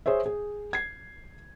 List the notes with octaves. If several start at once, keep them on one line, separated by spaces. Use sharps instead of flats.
G#4 C5 C#5 E5
G#4
G#6 C7